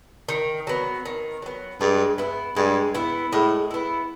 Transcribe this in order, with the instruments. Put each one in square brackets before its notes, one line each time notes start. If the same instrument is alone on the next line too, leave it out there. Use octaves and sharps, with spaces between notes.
[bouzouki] D#3
F#3 B3
D#3
F#3 B3
[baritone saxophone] G2 [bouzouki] G#3
[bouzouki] B3 E4
[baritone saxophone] G2 [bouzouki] G#3
[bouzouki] B3 E4
[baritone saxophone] A2 [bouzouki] G#3
[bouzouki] B3 E4